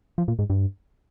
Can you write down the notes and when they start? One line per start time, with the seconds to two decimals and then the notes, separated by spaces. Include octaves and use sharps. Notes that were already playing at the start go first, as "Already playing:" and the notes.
0.18 F3
0.28 A#2
0.39 G#2
0.50 G2